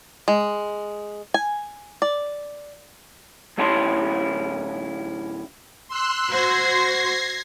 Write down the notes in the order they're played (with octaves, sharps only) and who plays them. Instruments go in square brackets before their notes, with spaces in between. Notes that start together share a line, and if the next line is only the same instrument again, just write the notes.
[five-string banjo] G#3
G#5
D5
[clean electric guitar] D2 A2 C#4 E4 A5 C6
[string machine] C6 E6 F#6
[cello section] F#4 C5 [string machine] G#6 A#6 C7